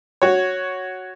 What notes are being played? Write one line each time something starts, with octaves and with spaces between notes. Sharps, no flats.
F#4 C#5